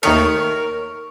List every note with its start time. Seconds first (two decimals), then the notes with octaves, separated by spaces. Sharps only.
0.03 D#2 D#3 A3 A#4 C#5